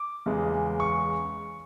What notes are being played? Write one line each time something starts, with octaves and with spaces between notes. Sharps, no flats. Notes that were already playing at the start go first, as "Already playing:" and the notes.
Already playing: D6
E2 C#3 G#3
C#6